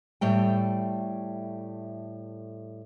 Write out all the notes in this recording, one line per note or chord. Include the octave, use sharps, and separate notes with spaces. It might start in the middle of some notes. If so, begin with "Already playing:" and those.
A2 G3 A3 G5